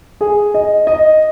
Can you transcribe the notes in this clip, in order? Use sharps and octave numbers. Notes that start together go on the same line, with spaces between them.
G#4
D#5
D#5